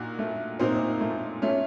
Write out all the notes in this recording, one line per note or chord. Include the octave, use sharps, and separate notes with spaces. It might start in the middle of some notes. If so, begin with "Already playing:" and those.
Already playing: A#2 D#4 F#4
A3
A#2 C4 D#4
A3
A3 C#4 F4